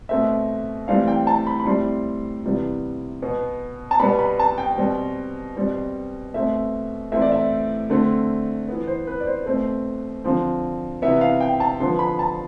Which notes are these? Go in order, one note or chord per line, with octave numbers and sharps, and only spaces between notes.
B2 A3 C4 E5
A2 E3 G3 C4 F5
G5
A5
B5
B5
A2 G3 C4 C6
C3 E3 G3 B3
B2 B3
A5
B2 G3 B3 B5
B5
A5
G5
B2 G3 C4
B2 G3 C4
B2 A3 C4 E5
A2 E3 A3 C4 E5
D5
E5
D3 A3 C4
E3 B3
C5
B4
D5
C5
B2 A3 C4 C5
D3 F3 C4
C3 E3 B3 E5
F5
G5
A5
D3 F3 B3 C6
B5
A5